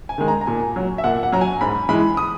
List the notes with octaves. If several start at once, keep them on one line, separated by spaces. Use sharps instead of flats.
G#5
D#3 G#3
A#5
A#5
A#2 G#5
F#3
E5
A#2 F#5
F#5
F#3 A#5
G#5
G#2 B5
E3 G#3 B5
D#6